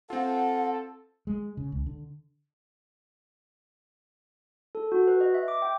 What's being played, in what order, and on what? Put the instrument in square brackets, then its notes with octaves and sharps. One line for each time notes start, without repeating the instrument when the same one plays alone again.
[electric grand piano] C4 F4 [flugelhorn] A4 [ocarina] F#5
[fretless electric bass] G#3
C#3
C#2
D3
[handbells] A4
F#4
B4
D#5
E5
D6
G5